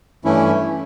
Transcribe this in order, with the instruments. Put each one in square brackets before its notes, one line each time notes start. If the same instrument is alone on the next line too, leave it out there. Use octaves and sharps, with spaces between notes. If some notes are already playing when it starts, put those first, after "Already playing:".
[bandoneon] G2 E3 A3 C#4 E4